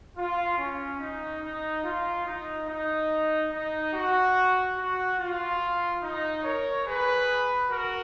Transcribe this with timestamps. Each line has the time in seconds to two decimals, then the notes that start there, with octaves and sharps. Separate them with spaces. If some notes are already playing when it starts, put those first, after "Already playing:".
0.16 F4
0.57 C#4
0.99 D#4
1.41 D#4
1.83 F4
2.25 D#4
2.67 D#4
3.51 D#4
3.93 F#4
4.76 F#4
5.18 F4
6.01 D#4
6.43 A#4 C#5
6.85 G#4 B4
7.68 F#4 A#4